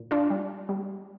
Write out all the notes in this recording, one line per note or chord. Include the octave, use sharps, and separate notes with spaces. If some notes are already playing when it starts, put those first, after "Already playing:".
Already playing: A#2
D4 F4
G3
G3